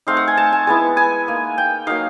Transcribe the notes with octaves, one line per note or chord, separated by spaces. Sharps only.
A3 C4 D#4 F5
F#5
G#5
A5
G#5
G#3 B3 E4 A5
G#5
A#3 D#4
G5
F#3 A#3 D#4 F5